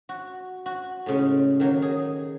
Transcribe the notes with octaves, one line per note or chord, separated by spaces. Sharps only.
F#4
F#4
A2 C#3 G#3
D#3 F#3 A#3
G#4